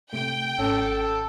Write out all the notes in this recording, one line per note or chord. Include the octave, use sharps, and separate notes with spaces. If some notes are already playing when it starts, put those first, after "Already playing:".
C3 A3 G5
G#1 C#4 A4